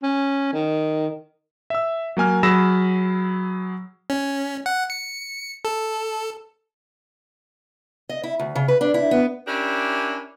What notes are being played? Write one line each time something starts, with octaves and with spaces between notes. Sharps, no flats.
C#4
D#3
E5 E6
F#3 A#3 G#5 F6
F#3 G#4 B5 E6 A#6 E7
C#4
F#5
C#7
A4
D#5
E4
D2
C#3
B4
D4
E4
B3
C#4 D4 E4 G4 A#4